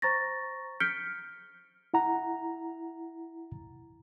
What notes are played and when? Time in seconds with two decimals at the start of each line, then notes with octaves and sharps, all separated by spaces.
0.02 C5 A#5 C#6 A6 A#6
0.80 F6 G6 B6 C#7 D7 G7
1.94 E4 F#5 A#5